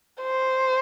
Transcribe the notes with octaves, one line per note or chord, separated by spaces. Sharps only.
C5